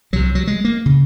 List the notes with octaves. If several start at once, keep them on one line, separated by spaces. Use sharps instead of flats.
C2 C3 F#3
F#3
G#3
A#3
C#3